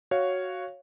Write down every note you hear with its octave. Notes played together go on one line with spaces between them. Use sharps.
F#4 C#5 F5